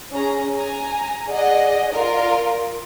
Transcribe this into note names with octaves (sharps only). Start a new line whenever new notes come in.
C#4 G#4 A#5
G#5 A#5
G#4 D5 D#5 F#5
F4 A#4 D5